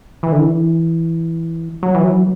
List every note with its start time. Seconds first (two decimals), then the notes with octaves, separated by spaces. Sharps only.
0.23 E3
0.32 D3
0.40 E3
1.83 F#3
1.94 E3
2.04 F#3